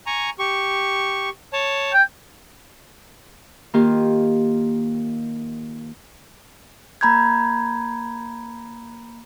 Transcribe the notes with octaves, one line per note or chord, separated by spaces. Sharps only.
G#5 A#5 C#6
G4 C#6
C#5 A5
G5
D#3 A#3 F4 G4
A#3 A#5 B5 G6 G#6